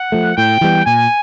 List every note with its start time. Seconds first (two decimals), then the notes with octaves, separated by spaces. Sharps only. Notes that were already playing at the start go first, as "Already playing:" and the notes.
Already playing: F#5
0.12 F3 A3
0.37 A2 G5
0.61 E3 G3 B3
0.85 A#2 G#5